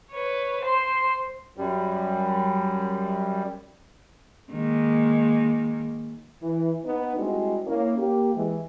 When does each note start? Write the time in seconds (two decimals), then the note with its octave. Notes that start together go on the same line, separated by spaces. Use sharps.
0.11 B4 C#5
0.61 C5 C6
1.57 F#2 G3
4.52 D#3 G#3 A#3
6.42 E3
6.84 B3 D#4
7.16 G3 G#3 C4 D4 E4 F#4
7.66 A#3 C#4 E4
7.98 A#3 G4
8.35 E3 G#3